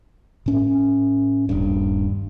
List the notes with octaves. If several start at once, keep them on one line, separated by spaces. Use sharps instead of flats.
A2 C#4
D#1 G2